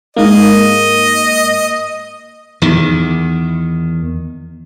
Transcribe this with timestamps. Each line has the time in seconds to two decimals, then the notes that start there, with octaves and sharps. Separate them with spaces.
0.17 G#2 A#3 D#5
2.62 E2 D#3